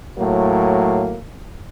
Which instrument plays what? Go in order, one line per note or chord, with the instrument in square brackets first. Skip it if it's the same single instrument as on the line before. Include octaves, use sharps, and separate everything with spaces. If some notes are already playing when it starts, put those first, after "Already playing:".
[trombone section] A2 F#3 A#3